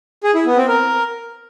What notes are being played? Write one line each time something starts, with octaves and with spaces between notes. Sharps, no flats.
G#4
E4
B3
C4
A#4